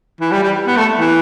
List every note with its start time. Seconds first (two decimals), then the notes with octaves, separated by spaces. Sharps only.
0.21 E3
0.32 G3
0.43 G3
0.67 B3
0.77 A3
1.00 E3